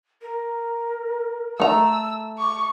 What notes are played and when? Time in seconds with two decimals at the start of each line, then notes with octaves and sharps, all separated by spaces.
0.22 A#4
1.60 A3 A#5 E6
2.39 C#6 D6